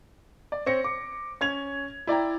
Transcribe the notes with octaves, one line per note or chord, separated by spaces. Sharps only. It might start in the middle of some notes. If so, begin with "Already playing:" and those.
D5
C4 C#5 A#6 C#7
D6
C#4 G#6 F7
E4 D5 G5 A#5